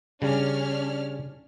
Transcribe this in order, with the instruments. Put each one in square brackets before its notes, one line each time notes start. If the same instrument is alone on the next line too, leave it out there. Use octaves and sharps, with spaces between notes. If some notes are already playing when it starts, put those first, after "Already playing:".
[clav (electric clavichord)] C#3 G3 [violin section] C#4 D4 F6